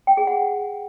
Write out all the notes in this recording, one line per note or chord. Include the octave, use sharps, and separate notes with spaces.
G5
G#4
F#5